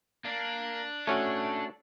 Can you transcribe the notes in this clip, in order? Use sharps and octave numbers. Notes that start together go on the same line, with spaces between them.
A#3 D4
A3 C#4 F#4 A4 C#5